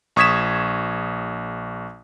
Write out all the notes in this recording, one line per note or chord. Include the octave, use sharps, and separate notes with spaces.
A#1 C#6 D#6 G#6 B6 E7